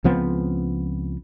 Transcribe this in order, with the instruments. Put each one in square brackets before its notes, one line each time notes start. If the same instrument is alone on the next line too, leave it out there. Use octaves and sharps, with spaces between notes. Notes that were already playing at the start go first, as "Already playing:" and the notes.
[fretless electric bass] C#2 F3 B3 C4